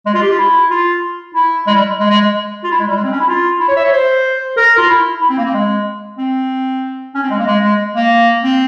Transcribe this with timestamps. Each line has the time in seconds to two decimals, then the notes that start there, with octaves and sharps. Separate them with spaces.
0.06 G#3
0.14 F4
0.22 G4
0.31 F4
0.38 E4
0.71 F4
1.35 E4
1.67 G#3
1.75 G3
2.00 G#3
2.10 G#3
2.21 G#3
2.64 F4
2.72 E4
2.80 G#3
2.88 G3
2.96 G#3
3.04 C4
3.12 C#4
3.20 E4
3.28 F4
3.60 E4
3.68 C#5
3.76 E5
3.85 C#5
3.93 C5
4.57 A#4
4.78 F4
4.89 E4
5.22 E4
5.30 C4
5.38 A#3
5.46 C4
5.54 G#3
6.18 C4
7.15 C#4
7.23 C4
7.31 G#3
7.39 A#3
7.47 G#3
7.63 G#3
7.96 A#3
8.44 C4